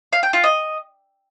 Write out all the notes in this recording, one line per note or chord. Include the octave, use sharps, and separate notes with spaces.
F5
G5
F4
D#5